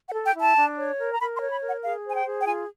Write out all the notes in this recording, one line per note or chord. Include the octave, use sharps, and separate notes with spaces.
F#5
A4
G5
E4
A5
D4
C#5
A#4
A#5
A#4 B5
C6
C#5
B5
A#4
F#5
G#4 F5
C5 G#5
G5
G#4
G5
F4 G#5